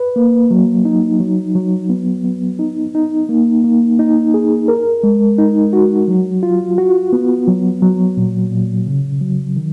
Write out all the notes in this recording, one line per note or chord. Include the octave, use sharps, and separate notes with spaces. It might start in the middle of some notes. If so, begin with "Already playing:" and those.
Already playing: B4
A#3
F#3
D#4
F#3
F#3
B3
B3
D#4
D#4
A#3
A#3
D#4
G#4
A#4
G#3
D#4
F#4
F#3
F4
F#4
B3
F#3
F#3
A#2
A#2
C#3
F#3
D#3